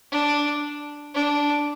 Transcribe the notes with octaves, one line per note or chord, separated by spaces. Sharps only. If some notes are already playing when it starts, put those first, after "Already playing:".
D4
D4